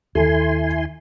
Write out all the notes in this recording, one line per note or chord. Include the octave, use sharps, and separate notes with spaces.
D#2 D#3 E4 A4 G#5 C6